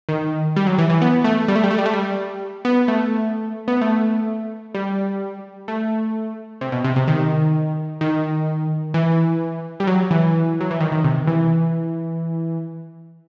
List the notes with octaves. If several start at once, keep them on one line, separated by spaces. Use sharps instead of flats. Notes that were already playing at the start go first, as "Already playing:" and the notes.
D#3
G3
F#3
E3
E3
B3
A3
G3
A3
G3
A3
G3
A3
G3
B3
A3
B3
A3
G3
A3
C3
B2
C3
C3
D#3
D#3
E3
G3
F#3
E3
F#3
E3
D#3
D#3
C3
E3